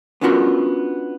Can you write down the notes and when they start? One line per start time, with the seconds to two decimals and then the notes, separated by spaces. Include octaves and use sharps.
0.21 B3 C#4 D4 F4 F#4 A#4